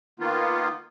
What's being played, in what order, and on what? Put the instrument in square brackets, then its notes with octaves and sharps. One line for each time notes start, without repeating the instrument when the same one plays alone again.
[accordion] D#3 A#3 B3 F4